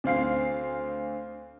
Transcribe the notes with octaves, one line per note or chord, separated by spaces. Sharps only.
D2 C4 F5 C7